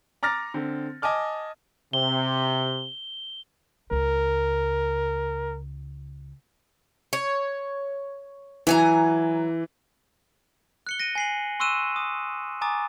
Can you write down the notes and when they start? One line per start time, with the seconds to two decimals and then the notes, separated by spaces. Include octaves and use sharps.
0.23 A#5 D6 F6 A6 A#6
0.54 D3 C4
1.02 D#5 G#5 A5 D6 F6
1.93 C3 G7
3.91 C#2 A#4
7.13 C#5
8.67 E3 F#3 G#5 A#5
10.87 F#6 C#7 G7
11.00 A#6 D7 D#7
11.15 G#5 C7 F#7
11.60 C6 C#6 E6 F#6 D#7 E7
11.96 D#6
12.62 G#5 A#5 D6 D#6 A6